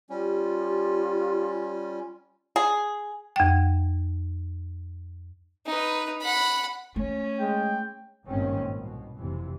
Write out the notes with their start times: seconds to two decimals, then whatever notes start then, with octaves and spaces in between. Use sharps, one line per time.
0.10 G3 C#4 F4 G4
2.56 G#4
3.36 F2 G5
5.66 D#4 B4
6.21 F#5 B5
6.96 A3 C#4
7.40 G#3 G5
8.26 G#1 G2 A#2 D#3 C4 C#4
8.76 C2 B2
9.15 F1 C3 E3